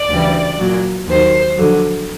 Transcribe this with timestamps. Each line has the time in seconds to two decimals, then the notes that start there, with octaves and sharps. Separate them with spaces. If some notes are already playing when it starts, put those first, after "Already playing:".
Already playing: D5
0.09 D2 C#3 E3 G3
0.58 A#2 F#3
1.07 D#2 D#3 F#3 C5
1.56 F2 D3 F#3